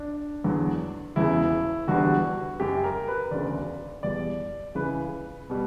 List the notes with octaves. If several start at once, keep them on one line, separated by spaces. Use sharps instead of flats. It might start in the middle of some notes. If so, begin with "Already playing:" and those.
Already playing: D4
E2 D3 F#3
E1 E2 C#3 E4
E1 E2 D3 G3 F#4
F#1 F#2 C#3 G4
A#4
B4
E1 D2 C#3 D5
E2 B2 G3 D5
C#2 C#3 E3 B4
B2 G3